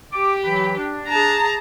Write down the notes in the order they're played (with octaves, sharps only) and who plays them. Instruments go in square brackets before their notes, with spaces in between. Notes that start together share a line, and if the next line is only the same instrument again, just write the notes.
[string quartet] G4 [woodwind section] D6
[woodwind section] E3 F#3 B5
D4
[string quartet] G#4 A5 A#5